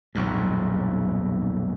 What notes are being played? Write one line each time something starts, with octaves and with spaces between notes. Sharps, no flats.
D#1 B1 F2 G#2